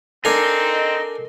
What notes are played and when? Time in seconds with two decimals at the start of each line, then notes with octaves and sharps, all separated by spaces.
0.25 C4 D4 A4 A#4 D#5 F5 G#5 A#5